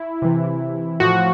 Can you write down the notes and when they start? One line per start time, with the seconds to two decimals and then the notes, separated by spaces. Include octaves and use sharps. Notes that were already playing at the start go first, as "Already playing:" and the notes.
Already playing: E4
0.22 C3 E3
1.00 A2 F3 F#4